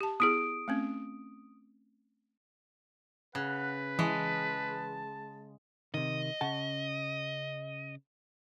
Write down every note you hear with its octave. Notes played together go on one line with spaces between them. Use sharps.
G4 A5
B3 E4 G#4 D#6 D7
A3 C4 C#4
C#3 B4 F#5
E3 G#3 A5
C3 D#3 D#5
C#3 F#5 A5